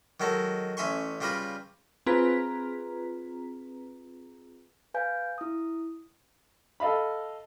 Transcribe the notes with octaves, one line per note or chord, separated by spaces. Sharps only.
D#3 F#3 G#3 A4
A1 C#4 E5 G#5 C6 C#6
C#3 G3 F4 B4 D5 A#5
C4 F4 G#4 B4 A#5 B6
B4 F5 G#5 G6
E4 D#6
A4 D#5 F5 B5